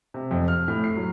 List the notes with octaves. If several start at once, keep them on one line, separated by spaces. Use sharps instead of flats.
C3
F2
F6
A2
C7
F#3